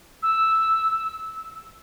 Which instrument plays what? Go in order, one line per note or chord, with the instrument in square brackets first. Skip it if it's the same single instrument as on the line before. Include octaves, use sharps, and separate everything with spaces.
[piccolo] E6